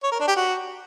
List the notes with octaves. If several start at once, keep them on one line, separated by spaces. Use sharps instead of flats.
C#5
A#4
D4
G4
F#4